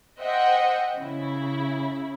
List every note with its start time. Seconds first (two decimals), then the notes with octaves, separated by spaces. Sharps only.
0.19 C5 D#5 E5 F#5 G5
0.97 C#3 E4